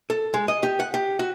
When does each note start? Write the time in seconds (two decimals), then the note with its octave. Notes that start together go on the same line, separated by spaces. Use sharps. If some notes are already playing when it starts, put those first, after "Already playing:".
0.10 A4
0.34 G#3
0.48 D#5
0.63 G4
0.80 F#5
0.94 G4
1.19 F#4